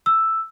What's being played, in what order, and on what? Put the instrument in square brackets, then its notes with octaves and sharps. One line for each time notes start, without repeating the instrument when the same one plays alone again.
[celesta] E6